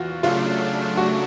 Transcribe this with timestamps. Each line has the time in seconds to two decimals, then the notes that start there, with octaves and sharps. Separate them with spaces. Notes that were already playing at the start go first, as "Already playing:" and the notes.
Already playing: E2 F4 F#4
0.23 C#3 F#3 A3 D4 F4
0.97 F#4